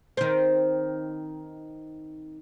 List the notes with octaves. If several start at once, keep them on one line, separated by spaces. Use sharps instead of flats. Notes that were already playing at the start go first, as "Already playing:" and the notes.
D#3 C4